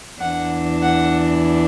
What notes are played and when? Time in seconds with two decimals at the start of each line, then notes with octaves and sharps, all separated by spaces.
0.20 E2 E3 D4 F#5
0.82 F#5